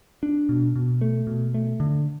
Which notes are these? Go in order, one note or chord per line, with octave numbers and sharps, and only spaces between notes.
D4
B2
B2
A3
B2
A3
D3